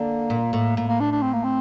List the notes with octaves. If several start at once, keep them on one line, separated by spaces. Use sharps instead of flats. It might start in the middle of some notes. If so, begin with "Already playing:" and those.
Already playing: D3 A#3
A#2
A2
A2 A#3
A#3
D4
D4
C4
A#3
C4